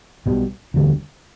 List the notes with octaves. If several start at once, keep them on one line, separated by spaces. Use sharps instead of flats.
B1 B2 G3
E1 D2 D3 G3